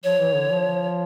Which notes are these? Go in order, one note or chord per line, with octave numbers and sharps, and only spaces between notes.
F3 C#5
E3
D3
F3